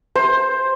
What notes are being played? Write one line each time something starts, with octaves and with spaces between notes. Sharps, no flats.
C5